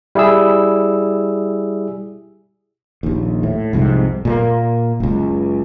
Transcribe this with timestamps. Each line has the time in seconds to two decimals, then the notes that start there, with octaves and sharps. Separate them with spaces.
0.15 G3 E4 G4 G#4 E6
3.03 A#1 D#2
3.43 A2
3.73 C2 F2 G#2 C3
4.25 A#2 G#3 A#3
5.00 F#1 C#2